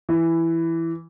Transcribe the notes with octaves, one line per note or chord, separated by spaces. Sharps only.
E3